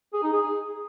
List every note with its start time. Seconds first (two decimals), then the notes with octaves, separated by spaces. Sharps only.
0.13 G#4
0.23 D#4
0.32 G#4